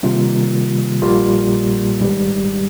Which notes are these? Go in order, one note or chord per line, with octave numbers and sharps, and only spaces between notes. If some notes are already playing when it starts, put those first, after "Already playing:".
C3 D#3 G3 A#3 F4
A#1 A#2 G3 A#3 F4
G#1 G#2 G3